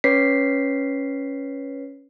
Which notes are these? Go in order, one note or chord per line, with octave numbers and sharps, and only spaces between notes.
C#4 B4 C#5 B6 C7